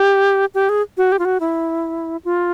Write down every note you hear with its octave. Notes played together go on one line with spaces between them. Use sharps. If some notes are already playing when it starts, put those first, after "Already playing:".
Already playing: G4
G4
G#4
F#4
G4
F4
F#4
E4
F4